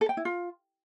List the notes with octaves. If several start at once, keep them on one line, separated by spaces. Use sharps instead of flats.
A4
G5
E4
F4